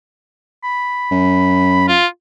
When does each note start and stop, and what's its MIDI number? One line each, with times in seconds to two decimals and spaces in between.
0.64 1.86 83
1.11 1.96 42
1.88 2.06 65